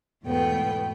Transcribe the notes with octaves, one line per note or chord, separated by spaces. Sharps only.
E2 G#2 B2 A3 B3 G5